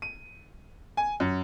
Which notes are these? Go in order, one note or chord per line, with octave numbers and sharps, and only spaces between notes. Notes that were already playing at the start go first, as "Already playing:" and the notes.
D#7
G#5
F#2